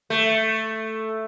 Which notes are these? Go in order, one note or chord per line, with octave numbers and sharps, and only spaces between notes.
A3